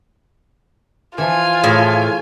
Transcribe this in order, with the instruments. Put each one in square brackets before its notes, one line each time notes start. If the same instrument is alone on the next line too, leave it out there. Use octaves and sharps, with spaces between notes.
[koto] E3 F3 [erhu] F4 [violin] G#5
[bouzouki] A2 [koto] G#4